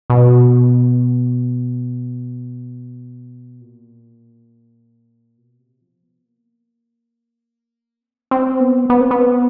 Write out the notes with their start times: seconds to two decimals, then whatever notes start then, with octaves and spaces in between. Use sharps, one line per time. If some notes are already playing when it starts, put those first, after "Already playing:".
0.10 B2
3.61 A#2
5.37 B2
5.59 C3
5.81 F3
6.03 B3
6.25 A#3
8.01 C4
8.31 C4
8.60 B3
8.90 B3
9.01 C4
9.11 B3